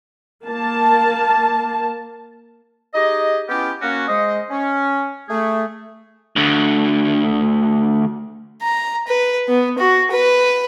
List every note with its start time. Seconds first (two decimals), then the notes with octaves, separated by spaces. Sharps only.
0.47 A#3 A5
2.95 D#4 G4 G#4 D#5
3.49 B3 C#4 E4 F4 G4
3.82 A#3 C#4 F#4
4.08 G#3 C5 D#5
4.50 C#4
5.29 A3 G#4
6.36 D2 D3
8.63 A#5
9.08 B4
9.48 B3
9.79 F#4
10.11 B4